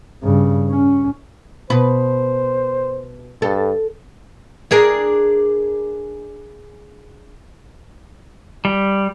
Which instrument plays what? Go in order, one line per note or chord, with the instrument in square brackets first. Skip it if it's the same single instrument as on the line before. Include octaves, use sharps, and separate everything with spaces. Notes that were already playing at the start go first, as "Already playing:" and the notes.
[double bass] G2 C#3
C#4
[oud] B2 B4 [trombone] C5
[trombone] G2 [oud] A4
[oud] D4 G#4 A#4
[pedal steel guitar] G3